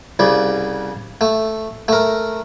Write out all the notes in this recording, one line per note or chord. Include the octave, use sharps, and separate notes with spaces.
C2 C#3 D5
A3
A3 A#4